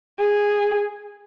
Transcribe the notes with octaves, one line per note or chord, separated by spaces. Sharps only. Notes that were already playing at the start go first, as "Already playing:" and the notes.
G#4